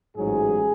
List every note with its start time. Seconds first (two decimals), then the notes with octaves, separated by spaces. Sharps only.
0.16 A1 G#2 F#3 G#4